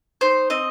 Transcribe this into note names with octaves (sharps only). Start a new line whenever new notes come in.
D#4 C5
C4 D#5